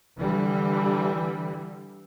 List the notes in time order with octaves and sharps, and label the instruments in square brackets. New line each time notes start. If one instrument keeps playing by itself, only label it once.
[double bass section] D3 E3 G3